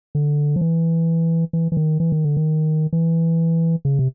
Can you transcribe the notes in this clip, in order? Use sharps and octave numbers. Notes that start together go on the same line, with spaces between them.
D3
F3
E3
E3
E3
D#3
E3
D#3
D3
D#3
E3
C#3
C3